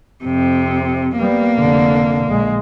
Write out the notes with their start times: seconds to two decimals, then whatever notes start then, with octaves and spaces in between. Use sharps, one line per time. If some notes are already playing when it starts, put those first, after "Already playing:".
0.24 F2 C3
1.19 G3 A#3 B3
1.58 F1 D3
2.26 A#1 G#3